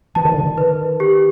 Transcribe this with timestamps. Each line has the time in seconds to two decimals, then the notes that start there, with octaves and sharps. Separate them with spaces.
0.15 E3 A5
0.25 D#3
0.34 D3
0.43 D#3
0.58 B4
1.00 G4